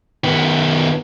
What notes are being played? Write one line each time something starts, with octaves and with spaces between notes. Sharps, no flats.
D#3 B3